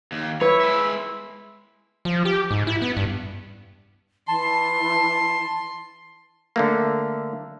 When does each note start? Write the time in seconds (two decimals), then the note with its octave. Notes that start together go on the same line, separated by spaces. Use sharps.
0.12 D#2
0.41 E4 B4 C#5
0.60 G#3 E5
2.05 F3
2.25 G4
2.51 G#2
2.67 E4
2.82 B3
2.97 G2
4.28 E3 A5 C6
6.56 D3 A3 A#3